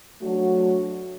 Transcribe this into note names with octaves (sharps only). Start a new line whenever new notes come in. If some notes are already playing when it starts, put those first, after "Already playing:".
F#3 A3 D4 F#4